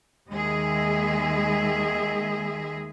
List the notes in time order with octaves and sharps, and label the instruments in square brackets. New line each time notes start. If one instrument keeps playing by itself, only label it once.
[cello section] D#2 D#3 G#3 G#4 D#5 E5